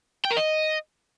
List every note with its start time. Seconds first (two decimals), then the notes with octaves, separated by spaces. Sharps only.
0.25 G5
0.31 A#4
0.37 D#5